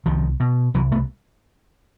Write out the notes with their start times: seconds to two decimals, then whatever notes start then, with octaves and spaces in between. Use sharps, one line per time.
0.06 C2 D#3 F3
0.40 B2
0.74 C2 E3 F#3
0.92 A3 B3